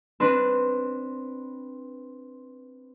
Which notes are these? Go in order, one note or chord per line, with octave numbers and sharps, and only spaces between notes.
C4 D4 B4